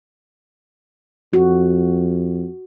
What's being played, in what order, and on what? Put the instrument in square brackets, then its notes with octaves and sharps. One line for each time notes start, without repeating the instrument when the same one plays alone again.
[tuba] F2 [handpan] F#4